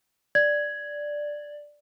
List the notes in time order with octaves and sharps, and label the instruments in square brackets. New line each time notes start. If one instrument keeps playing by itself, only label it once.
[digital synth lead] D5 [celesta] G#6